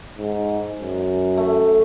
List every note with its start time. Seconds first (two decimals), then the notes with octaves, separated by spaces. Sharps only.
0.18 G#2
0.79 F#2
1.37 A3